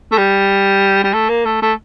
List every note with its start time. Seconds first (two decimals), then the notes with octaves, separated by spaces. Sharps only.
0.12 A3
0.18 G3
1.04 G3
1.14 A3
1.29 A#3
1.45 A3
1.62 A3